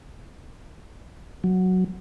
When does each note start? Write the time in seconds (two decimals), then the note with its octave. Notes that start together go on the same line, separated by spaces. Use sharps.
1.44 F#3